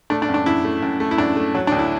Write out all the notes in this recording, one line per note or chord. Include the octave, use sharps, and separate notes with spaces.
A3 D4
D4
F#2
D4
F#2 E4
A3
F#2
A3
E4
F#2 D4
A3
F#3
D2 D4
E4